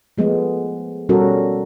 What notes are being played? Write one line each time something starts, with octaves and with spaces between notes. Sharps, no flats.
F3 G#3 A3 B3
B2 G3 C#4 F#4 A4 A#4